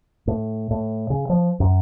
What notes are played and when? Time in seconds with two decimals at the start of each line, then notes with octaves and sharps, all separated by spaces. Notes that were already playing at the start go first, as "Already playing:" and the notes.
0.27 A2
0.71 A2
1.10 C#3
1.29 F3
1.60 F#2